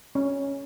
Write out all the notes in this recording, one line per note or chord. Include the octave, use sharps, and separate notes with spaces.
C#4